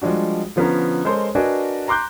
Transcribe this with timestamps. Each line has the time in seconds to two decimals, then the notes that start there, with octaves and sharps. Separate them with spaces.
0.02 F3 G3 G#3 D4 F#4
0.56 D3 F3 B3 C#4 A#5
1.05 G#3 A4 A#4 C5 C#5 C6
1.35 D4 F#4 A#4 B4 D#5 G#5
1.88 A#5 C6 D6 F#6 G6